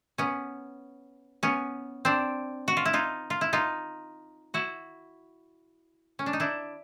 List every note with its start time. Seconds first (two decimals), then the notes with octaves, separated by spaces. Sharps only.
0.18 B3 C#4
1.43 B3 C#4
2.05 C4 D4
2.68 F#4
2.77 F4
2.85 E4
2.93 D#4 F4
3.30 F4
3.41 E4
3.53 D#4 F4
4.54 E4 F#4
6.19 C#4
6.26 D4
6.33 D#4
6.40 D4 E4